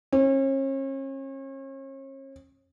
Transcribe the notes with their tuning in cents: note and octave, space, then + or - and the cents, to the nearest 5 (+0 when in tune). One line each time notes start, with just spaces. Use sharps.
C#4 -40